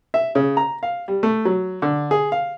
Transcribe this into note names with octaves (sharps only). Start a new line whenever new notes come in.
E5
C#3
A#5
F5
G3
A3
F#3
D3
G#4
F5